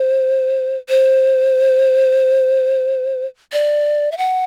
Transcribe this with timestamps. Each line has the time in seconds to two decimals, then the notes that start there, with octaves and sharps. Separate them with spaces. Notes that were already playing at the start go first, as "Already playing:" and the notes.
Already playing: C5
0.89 C5
3.52 D5
4.12 E5
4.18 F#5